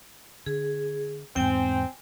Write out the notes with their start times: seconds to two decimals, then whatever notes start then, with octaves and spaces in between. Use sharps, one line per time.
0.46 D3 G#4
1.36 E2 G#2 C4 G5 G#5